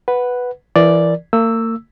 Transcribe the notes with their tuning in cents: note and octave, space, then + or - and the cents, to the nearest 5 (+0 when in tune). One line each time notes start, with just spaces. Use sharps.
B4 +0 F#5 +0
E3 +20 A#4 +5 D5 +0
A#3 -40 E6 +0